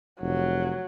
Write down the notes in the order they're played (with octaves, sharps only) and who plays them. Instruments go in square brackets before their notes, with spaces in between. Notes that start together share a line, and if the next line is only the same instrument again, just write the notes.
[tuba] F1 [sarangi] F#3